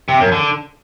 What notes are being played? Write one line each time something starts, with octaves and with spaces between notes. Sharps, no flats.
C3
F#2
D3